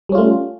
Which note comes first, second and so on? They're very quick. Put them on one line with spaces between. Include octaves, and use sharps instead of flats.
G3 C#4 F4 A3